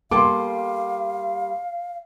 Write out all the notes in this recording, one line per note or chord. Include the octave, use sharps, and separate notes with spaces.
G3 A#3 A4 F5 C6 D6